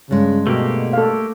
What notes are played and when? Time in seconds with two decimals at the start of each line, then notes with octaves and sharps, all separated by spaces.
0.11 G2 C#3 G#3
0.47 B2 A3 A#3 G4
0.93 A4 F5